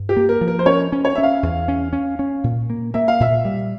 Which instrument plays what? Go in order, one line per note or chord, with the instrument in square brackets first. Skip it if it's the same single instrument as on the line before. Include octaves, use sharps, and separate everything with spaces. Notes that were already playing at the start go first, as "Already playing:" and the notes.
Already playing: [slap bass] G2
[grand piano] G4
[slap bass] A#3
[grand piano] A#4
[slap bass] F3
[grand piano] A#4
C5
[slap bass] C#4 [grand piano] C#5
[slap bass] C#4
[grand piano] C#5
[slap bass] C#4 [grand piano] E5
[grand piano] F5
[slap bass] E2
C#4
C#4
C#4
A#2
A#3
[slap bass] A#3 [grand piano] E5
[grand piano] F5
[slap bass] A#2 [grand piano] E5
[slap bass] G3